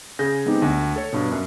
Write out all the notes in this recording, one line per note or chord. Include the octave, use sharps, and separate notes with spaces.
C#3 G#4 G6 A#6
G#3 B3 C4 D#4 G4
D2
A4 C#5
G2 B2
F#2